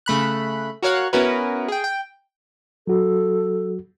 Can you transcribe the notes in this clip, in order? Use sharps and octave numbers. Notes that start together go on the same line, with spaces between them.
C#3 A3 B5 F#6
F#4 A#4 C#5 F5 F#5 F#6
B3 C#4 E4 F#4 A#4 B4
G#4 G5
G5
F#3 F#4 A4